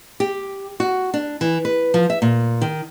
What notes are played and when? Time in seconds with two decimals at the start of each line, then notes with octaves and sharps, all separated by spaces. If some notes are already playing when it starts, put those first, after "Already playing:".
0.20 G4
0.80 F#4
1.14 D4
1.41 E3
1.65 B4
1.94 F3
2.10 E5
2.22 A#2
2.61 D#3